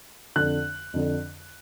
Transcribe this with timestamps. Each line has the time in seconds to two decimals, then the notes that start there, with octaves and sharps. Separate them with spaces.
0.36 F2 D3 F#6
0.93 F2 D3